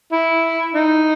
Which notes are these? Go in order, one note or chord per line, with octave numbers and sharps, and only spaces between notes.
E4
D#4